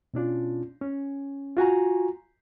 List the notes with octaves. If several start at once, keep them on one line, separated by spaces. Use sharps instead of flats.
B2 C#4 D4 F4
C#4
F4 F#4 G#5 A#5